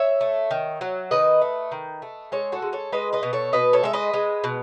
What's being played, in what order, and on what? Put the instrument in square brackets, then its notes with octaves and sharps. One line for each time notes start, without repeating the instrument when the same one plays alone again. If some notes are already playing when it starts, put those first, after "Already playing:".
Already playing: [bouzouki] C#5 E5
A3
D#3
F#3
D#3 B4 D#5
A3
D#3
A3
G#3 A4 C#5
F#4 A4
G#3
A4 C#5
G#3 B4 D#5
B4 D#5
B2
A4 C#5
B2 B4 D#5
A4 C#5
G#3 E5
B4 D#5
G#3
B2